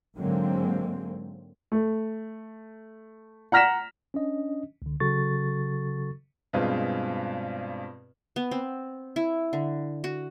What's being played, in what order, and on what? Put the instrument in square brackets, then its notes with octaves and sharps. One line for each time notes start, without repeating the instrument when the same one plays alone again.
[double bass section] G#2 D3 F#3 G#3 A#3 C4
[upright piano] A3
F#5 A#5 F6 A#6 B6 E7
[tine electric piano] C#4 D4 D#5
C#2 D3
C#3 F#3 F#4 A4 C#6 A6
[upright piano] G2 B2 G#3 C4 F4
[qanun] B3
C4
E4
D3
F#4